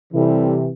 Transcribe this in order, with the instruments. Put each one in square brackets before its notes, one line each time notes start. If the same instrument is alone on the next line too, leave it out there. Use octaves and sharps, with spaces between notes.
[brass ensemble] C3 E3 [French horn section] G3 C4 E4 A4